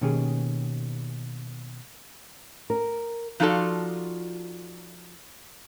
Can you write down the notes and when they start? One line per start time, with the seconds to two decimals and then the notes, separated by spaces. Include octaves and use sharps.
0.01 B2 D#3 A#3 C#4 G4 G#4
2.70 A#4
3.40 F3 D#4 F4 F#4 A4 D5